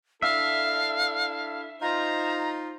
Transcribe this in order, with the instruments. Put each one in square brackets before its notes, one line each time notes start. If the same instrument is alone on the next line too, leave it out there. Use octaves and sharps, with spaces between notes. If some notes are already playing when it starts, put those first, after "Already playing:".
[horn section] D4 E4 A4 [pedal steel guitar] E5 [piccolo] F5
[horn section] D#4 F4 C5 [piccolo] A#5